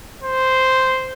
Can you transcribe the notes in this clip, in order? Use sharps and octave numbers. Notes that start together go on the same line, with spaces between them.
C5